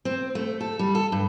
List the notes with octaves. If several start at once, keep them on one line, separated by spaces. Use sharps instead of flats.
C4
A3
A4
G3
A4
G2